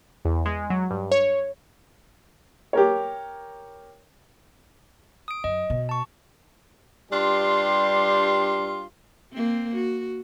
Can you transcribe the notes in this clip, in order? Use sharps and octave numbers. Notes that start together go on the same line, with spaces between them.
E2
G#3
F#3
G2
C#5
G4 A#4 C#5
D#6 D7
F#2 D#5
B2
A5 C#6
G2 G3 D4 F4 G4 C6
A#3 C4
F#4